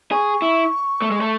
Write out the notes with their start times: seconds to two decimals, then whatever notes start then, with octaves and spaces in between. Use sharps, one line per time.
0.12 G#4 C#6
0.42 E4
1.02 A3
1.11 G#3
1.21 A3